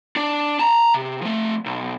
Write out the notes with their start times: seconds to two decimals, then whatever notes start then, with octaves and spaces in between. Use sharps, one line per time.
0.16 D4 D5
0.59 A5 A#5
0.94 C3
1.22 F3 A3
1.66 B1